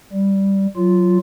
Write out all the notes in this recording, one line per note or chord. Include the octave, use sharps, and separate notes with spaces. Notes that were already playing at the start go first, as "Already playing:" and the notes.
G3
F#3 F4